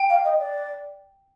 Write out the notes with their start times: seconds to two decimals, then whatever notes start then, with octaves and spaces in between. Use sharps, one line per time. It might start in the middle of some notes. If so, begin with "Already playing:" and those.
Already playing: G5
0.09 F5
0.24 D#5
0.39 D5